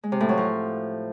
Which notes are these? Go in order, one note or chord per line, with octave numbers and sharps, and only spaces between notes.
G#3
C3
A2
F#3
F3